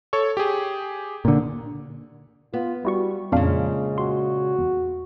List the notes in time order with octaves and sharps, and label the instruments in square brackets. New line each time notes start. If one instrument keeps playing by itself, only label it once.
[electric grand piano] A4 C#5 C#6
G4 G#4
[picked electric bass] A#2 D3
[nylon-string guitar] B3 [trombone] F4
[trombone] G3 [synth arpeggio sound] E4 F#4 C#6
[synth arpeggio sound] F2 D4 F5 [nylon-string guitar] A#2 C#3 [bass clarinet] F3 [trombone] G#3
[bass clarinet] F#4 [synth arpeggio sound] C6
[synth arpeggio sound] E2